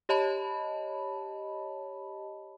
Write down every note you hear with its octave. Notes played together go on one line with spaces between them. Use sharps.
G4 C#5 D#5 A5 B5